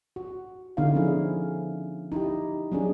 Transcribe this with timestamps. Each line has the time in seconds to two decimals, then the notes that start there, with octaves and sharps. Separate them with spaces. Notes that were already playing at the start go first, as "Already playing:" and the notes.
0.16 F#4
0.77 D3 B3 D#4 E4 F5
0.95 F3 C#4 E4 G#4
2.12 D#4 E4 G4
2.72 F#3 B3 C#4 D4 F#4 G#4